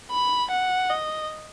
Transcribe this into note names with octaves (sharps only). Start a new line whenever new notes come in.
B5
F#5
D#5